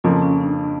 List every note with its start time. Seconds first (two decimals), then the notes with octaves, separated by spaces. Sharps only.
0.04 F2 C#3 F3 A#3 F4
0.22 C#4
0.41 D4
0.59 D4